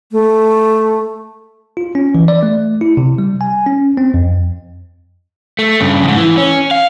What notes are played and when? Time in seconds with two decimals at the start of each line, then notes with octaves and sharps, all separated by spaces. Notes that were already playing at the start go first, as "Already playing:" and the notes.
0.12 A3
1.77 F4
1.95 C#4
2.15 E3
2.28 D5
2.43 A3
2.81 E4
2.97 C3
3.18 G3
3.41 G#5
3.66 C#4
3.97 C4
4.14 F2
5.59 A3
5.80 G2 C#3
6.04 F2 G#2
6.17 E3
6.37 C#4
6.71 F5